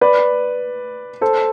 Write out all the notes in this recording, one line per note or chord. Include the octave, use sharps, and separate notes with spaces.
B4 D5
A4 C5